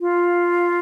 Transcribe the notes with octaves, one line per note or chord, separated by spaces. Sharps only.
F4